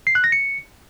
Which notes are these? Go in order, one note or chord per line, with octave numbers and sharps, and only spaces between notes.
C7
F#6
A#6
C#7